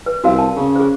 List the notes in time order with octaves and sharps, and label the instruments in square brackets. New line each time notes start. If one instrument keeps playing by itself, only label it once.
[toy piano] B4
[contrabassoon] C2 [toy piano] F#4 A#4 F5
[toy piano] A5
[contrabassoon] C#3
[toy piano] G#4 C5